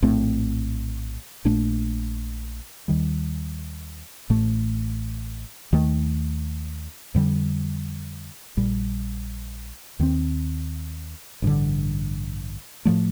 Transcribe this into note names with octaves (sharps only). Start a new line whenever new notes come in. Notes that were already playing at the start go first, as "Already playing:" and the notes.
A#1 A2 A3 C4
A#1 A#2 A3 D4
D#2 D#3 G3
A1 A2 A3
D#2 D#3 A3
F2 D3 G3
A#1 A#2 G3
D#2 D#3 A3 C4
A1 G2 D3
A2 F3 A3